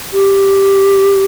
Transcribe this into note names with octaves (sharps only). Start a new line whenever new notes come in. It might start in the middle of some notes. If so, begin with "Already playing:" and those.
G4